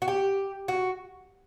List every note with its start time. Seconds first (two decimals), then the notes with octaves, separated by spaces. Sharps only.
0.02 F#4
0.08 G4
0.68 F#4